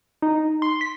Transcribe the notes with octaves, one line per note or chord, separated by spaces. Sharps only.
D#4
C6
B6